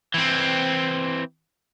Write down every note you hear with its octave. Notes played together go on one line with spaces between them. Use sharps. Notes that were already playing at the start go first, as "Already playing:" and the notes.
E3 C4